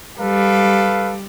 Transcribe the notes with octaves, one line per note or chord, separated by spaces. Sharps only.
G3 A4 B4 F5